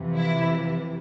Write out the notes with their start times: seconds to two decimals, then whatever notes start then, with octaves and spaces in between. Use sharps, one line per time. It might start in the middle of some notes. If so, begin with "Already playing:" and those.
Already playing: F2 C3 E3
0.17 E4